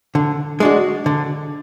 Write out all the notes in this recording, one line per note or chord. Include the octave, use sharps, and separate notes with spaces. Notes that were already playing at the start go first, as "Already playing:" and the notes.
D3
G#3 D4 F#4
D3